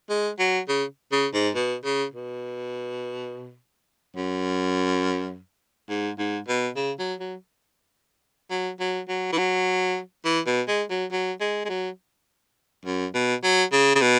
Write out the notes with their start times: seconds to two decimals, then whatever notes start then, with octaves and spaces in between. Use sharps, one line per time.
0.09 G#3
0.39 F#3
0.69 C#3
1.12 C#3
1.34 G#2
1.55 B2
1.84 C#3
2.13 B2
4.16 F#2
5.90 G#2
6.19 G#2
6.48 B2
6.76 C#3
6.99 F#3
7.20 F#3
8.50 F#3
8.80 F#3
9.09 F#3
9.32 E3
9.38 F#3
10.25 E3
10.46 B2
10.68 G#3
10.90 F#3
11.12 F#3
11.40 G#3
11.65 G#3
11.69 F#3
12.85 F#2
13.14 B2
13.43 F#3
13.72 C#3
13.95 C#3
14.02 B2